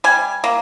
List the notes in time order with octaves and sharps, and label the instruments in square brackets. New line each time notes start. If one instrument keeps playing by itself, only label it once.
[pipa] G3 G#5
A#3